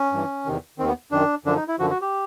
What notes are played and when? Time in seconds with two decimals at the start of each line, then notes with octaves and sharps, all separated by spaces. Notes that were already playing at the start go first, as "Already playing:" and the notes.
Already playing: C#4
0.12 G2 E3
0.46 E2 C3 D#3
0.78 D#3 C4
0.82 D#2
0.87 B3
1.12 F#2 D#3 D4
1.45 F#2 D3 F3 D4
1.56 D#4
1.68 E4
1.79 F#2 D3 F3 F#4
1.90 F#4
2.01 G4